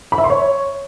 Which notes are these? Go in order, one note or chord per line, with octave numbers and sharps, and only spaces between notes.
B5
E5
C6
C#5